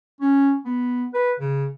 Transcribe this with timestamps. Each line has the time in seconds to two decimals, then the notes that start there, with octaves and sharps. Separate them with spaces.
0.21 C#4
0.65 B3
1.14 B4
1.40 C#3